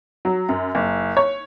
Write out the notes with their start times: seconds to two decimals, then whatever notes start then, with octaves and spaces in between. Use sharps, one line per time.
0.25 F#3
0.49 F#2
0.75 F#1
1.17 C#5